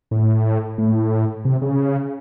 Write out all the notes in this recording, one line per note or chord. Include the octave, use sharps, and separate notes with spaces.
A2
A2
C3
C#3